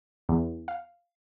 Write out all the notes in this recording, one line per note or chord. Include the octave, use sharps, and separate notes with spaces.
E2
F5